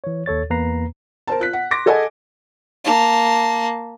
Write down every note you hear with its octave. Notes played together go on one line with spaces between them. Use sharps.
E3 C#5
D#2 A4 C#5 A6
E2 A#3 B4 A#5 C7
A#4 C5 A5
F4 F#6 B6
F#5
C6 D6 A#6
G#4 A4 D#5 F#5 G#5
A#3 A5